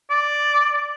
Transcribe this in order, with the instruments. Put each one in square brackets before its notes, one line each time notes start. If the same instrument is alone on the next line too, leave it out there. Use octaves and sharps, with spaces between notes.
[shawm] D5